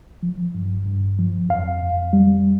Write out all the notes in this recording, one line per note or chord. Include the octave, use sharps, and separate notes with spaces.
F3
G2
G2
F3
F2 F5
F2
G3